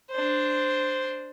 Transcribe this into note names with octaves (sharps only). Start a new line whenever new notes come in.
D4 C5